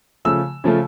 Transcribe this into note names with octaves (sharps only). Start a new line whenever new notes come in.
C#3 F3 A3 E6
C#3 F3 A3